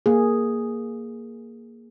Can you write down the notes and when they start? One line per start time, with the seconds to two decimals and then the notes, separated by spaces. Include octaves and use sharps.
0.06 A#3 G#4